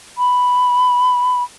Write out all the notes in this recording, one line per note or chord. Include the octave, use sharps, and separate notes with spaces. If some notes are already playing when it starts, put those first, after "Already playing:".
B5